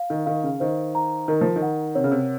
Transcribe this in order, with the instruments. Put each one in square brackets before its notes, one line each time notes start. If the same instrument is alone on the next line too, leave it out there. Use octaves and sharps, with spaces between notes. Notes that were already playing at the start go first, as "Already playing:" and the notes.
Already playing: [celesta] F5
[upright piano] D#3
[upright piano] D#3 [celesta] F5
[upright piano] C#3
[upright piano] D#3 [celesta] C5
[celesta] A#5
[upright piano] D#3 [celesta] A#4
[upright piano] F3
D#3
[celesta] F#5
[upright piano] C3 [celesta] C#5
[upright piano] C#3
C3